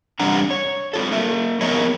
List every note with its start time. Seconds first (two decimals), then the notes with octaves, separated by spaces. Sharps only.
0.20 E2 C3 G3 D4 F#5 A#5
0.50 C#5
0.93 D4 F4 A4
1.12 A#3 E5
1.61 F3 B3 G#4 A#4 C#5 D#5